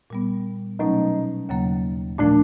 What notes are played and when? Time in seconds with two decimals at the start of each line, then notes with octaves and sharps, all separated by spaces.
0.10 A#2 G3 B3
0.79 B2 F#3 A3 C#4 D#4
1.49 D#2 C#3 F#3 A#3
2.18 A#2 F3 A3 D4